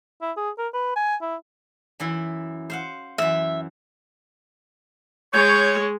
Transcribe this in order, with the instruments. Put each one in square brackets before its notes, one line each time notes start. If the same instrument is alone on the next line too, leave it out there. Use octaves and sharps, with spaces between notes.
[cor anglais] E4
G#4
A#4
B4
G#5
E4
[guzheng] F#2 E3 E4
C5 F5 F#5
[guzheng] F#2 E3 [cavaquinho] E5
[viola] G#3 [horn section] C#5 [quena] G6